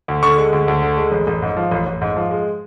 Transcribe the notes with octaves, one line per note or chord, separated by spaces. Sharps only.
D2
D3 C#6
G#3
D2
D2
D3
G#3
A1
A1
G#2
F3
A1
A1
G#2
F3
G#3